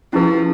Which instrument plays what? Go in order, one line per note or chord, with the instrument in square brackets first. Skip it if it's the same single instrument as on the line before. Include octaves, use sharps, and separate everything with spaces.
[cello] F3 [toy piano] C#4 E4 G#4 B4